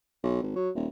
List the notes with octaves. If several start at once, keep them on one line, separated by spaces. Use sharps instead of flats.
B1
G#1
F#3
D#1